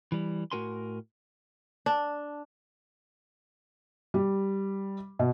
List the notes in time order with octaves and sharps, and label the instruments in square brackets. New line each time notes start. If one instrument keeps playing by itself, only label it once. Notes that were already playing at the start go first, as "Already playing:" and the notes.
[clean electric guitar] E3 G3
A2 F#4 A#4 G#5 C6
[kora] D4
[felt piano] G3
B2